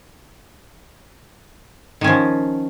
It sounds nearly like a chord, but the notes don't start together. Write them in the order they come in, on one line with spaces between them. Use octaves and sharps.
D#3 C#4 F3